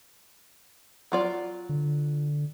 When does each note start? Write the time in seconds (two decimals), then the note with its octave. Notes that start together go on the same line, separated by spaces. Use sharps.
1.12 F#3 F4 D5
1.69 D3